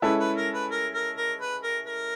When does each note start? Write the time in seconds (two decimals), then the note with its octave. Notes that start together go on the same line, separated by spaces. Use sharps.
0.02 G#3 C#4 E4 A4 B4
0.20 B4
0.37 A#4
0.54 B4
0.71 A#4
0.94 A#4
1.17 A#4
1.40 B4
1.63 A#4
1.87 A#4